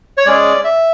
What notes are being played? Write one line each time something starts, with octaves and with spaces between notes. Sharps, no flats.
C#5
G#3 C#4 G#4 D5
E5